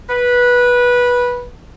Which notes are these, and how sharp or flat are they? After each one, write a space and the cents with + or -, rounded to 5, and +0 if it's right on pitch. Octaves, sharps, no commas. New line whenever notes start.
B4 -15